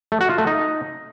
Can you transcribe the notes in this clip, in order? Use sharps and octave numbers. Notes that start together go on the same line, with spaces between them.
A3
F#4
F4
A3
D#4